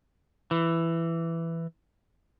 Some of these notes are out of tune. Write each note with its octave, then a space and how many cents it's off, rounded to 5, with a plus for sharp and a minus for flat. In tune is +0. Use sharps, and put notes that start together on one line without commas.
E3 +10